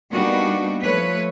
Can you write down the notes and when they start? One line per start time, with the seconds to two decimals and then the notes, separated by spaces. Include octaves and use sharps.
0.11 G3 A#3 B3 D4 D#4 F#4
0.83 F3 A3 B4 C#5